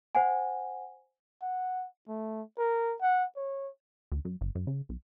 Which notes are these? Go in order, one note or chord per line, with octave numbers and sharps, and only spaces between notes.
C5 F#5 G#5
F#5
A3
A#4
F#5
C#5
D2
F#2
G1
F#2
C#3
B1